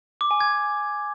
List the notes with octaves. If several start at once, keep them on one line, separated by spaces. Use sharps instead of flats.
D6
G#5
G#6